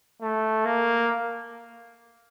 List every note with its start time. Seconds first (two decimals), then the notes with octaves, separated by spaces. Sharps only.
0.22 A3
0.65 A#3